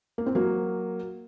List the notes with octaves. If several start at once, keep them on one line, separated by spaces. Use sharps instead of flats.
A#3
C4
F#3 A#3